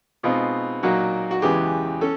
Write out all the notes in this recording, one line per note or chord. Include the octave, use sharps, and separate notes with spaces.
B2 G#3 C4 D#4 F4
A#2 F#3 A#3 D#4 F#4
F#4
E2 C#3 E3 G#3 B3 G4
C#4 A4